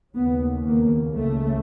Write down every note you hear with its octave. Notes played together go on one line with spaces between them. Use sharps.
D#2 C#3 B3
A#3
C#2 C#3 A3